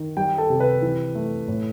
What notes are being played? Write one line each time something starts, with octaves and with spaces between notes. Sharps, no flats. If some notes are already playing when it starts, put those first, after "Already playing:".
Already playing: D#3
G3 G5
A4
C3
B4
E3
A3
A2